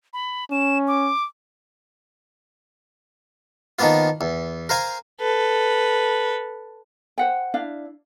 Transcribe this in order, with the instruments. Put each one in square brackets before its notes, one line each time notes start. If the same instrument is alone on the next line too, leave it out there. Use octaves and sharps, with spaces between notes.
[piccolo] B5
[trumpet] C#4 [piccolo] E7
[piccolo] D6
[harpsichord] D#3 F3 A#3 B3 F4
E2
A#4 C5 F5 G#5
[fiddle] A4 B4
[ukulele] C5 F#5 G5
D4 E4 F5